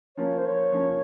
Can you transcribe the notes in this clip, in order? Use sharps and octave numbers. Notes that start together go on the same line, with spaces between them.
F3 A#3 C#4 F4 A#4 C#5
C5
C#5
F3 A#3 C#4 F4 A#4